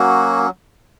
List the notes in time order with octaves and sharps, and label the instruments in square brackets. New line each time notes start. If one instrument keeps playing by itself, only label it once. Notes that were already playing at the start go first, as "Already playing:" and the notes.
Already playing: [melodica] F#3 A#3 C#4 F#4